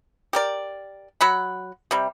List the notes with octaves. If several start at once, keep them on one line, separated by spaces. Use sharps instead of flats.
G4 A#4 D5
F#3 F#5 B5
C3 G3